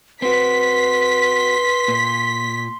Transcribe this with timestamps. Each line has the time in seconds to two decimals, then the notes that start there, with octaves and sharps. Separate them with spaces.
0.22 C4 F#4 B4 C6 B6
1.88 A#2